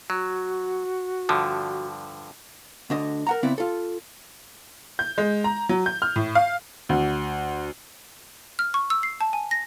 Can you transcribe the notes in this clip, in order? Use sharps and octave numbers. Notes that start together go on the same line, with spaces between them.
F#3 F#4
G2 D3 F3
D2 D3 D#5
A#4 F#5 A#5
C#3 B3 C4 E4 D5
F4 A4
G6
G#3
A#5
F#3
G6
F6
A2
F5
D2
F6
C#6
E6
C7
A5
G#5
A#6